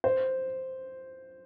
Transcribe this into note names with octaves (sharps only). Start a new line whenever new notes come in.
C5